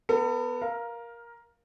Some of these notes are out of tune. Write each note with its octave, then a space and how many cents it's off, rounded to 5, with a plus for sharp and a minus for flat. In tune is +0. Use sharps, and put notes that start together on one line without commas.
B3 +0 A4 +45
A#4 +10 F5 +0